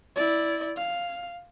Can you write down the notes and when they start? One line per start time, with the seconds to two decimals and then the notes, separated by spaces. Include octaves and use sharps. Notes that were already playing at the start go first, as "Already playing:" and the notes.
0.16 E4 D5
0.77 F5